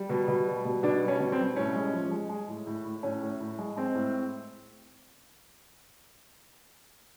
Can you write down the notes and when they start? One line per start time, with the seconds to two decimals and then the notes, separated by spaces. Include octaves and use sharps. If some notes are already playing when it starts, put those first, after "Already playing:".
Already playing: G3
0.09 B2
0.28 B2
0.46 G3
0.65 B2
0.83 B2 D4
1.02 G3
1.08 C#4
1.19 B2
1.32 C4
1.39 G3
1.56 A2 C#4
1.75 G#3
1.93 F3
2.11 G#3
2.29 G#3
2.48 A2
2.67 A2
2.85 A2
3.03 A2 C#4
3.22 A2
3.40 A2
3.58 G#3
3.76 G#3 C4
3.95 A2